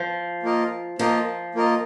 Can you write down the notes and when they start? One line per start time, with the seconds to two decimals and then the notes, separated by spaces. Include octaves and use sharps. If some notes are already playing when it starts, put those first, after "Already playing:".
Already playing: F3
0.43 A#3 F4 A#4 D#5
0.99 F3 A#3 F4 A#4 D#5
1.55 A#3 F4 A#4 D#5